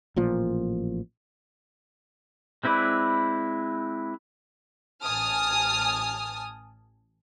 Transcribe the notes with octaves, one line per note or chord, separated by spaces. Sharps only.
A1 A#2 F3
G#3 C4 E4 B4 D5
A1 G#5 A5 D#6 F6